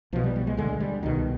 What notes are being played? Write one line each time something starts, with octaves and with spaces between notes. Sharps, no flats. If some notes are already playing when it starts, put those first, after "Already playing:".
B1 B2 F3
G3
G3
G#3
D2 D3 G#3
G3
C2 B2 D#3